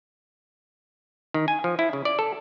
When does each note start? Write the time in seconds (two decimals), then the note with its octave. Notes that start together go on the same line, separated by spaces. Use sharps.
1.34 D#3
1.48 G#5
1.64 F3
1.79 E4
1.93 C#3
2.05 D5
2.19 A4